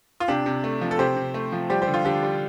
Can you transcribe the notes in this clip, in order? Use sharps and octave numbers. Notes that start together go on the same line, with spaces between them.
F4
C3 D4 G4
C3
A3
F3
A4
C3 G4 C5
C3
A3
F3
G3 G4 C5
G4 C5
D3
F4
D3 D4 G4
G3